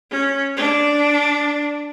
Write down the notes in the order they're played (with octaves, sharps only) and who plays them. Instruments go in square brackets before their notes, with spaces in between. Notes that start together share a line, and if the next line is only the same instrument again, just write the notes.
[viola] C#4
D4